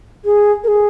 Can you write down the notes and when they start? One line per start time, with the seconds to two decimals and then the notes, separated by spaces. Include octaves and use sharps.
0.25 G#4
0.64 A#4
0.68 G#4